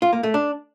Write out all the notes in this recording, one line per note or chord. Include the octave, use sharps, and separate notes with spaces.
F4
A#3
A3
D4